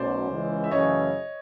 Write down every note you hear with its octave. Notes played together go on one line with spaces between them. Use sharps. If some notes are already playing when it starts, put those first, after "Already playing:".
Already playing: B1 B2 F#3 A3 C#4 C5 D5
C#2 C#3 E3 G#3
E5
F#2 C#3 E3 A3 C#4 C#5 D#5